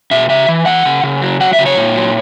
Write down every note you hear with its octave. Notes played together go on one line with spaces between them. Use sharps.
B2 E5
C#3 E5
E3
E3 F#5
C#3
C#3
F#3
F#3 F#5
E5
C#3
C#5
A#2
F#3